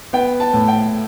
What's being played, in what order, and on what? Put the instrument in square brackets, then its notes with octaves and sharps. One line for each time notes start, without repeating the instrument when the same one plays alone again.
[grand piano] B3 [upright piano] G5
[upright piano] A5
[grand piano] A2
[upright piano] G5